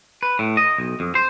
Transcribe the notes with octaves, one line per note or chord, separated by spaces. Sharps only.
B4
A2
D#5
B1
F2
C5